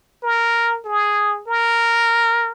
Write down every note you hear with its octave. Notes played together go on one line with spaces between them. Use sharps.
A#4
G#4
A#4